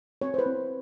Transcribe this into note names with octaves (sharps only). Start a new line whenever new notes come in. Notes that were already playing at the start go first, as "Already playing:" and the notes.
C4 C#5
C5
B4
C4